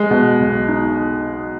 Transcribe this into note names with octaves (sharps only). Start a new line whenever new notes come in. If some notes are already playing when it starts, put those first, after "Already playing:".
Already playing: G#3
B2
B1
D#4